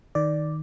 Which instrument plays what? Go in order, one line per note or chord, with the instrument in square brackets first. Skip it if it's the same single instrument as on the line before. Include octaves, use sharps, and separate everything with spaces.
[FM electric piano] D#3 D5